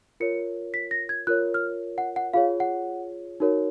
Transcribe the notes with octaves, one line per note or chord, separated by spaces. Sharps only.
F4 A#4 C#5 C#7
B6
A#6
G#6
F4 A#4 C#5 F#6
F6
F#5
F#5
F4 G#4 C#5 F5
F#5
D#4 F#4 A#4 C#5